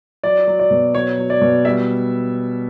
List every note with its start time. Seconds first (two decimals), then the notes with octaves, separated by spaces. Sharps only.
0.24 F#3 D5
0.47 F#3
0.59 D5
0.71 B2
0.95 F#3 C#5
1.18 F#3
1.30 D5
1.41 B2
1.65 G3 E5